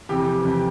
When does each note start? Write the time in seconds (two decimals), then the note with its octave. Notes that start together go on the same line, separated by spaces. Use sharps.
0.09 F2 C3 E3 G4
0.45 F2 C3 E3